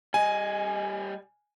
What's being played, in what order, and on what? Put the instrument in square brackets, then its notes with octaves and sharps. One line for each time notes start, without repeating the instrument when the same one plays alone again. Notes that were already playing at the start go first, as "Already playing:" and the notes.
[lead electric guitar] G3 D#5 [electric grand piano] G#5